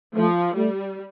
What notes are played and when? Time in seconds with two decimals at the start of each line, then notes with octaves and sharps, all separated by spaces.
0.15 F3 A3
0.55 G3 A3